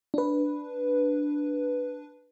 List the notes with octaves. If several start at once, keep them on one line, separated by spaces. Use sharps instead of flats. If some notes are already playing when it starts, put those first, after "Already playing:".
D4 B4